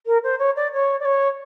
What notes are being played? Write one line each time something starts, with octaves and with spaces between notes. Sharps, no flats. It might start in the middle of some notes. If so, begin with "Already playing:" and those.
A#4
C5
C#5
D5
C#5
D5
C#5